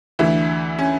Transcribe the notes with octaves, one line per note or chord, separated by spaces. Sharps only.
D2 D3 E3 E4
C#4